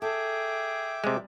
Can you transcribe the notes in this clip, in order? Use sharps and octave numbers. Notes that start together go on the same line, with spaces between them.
G#4 A4 E5 G5 D6
C3 G3 G#3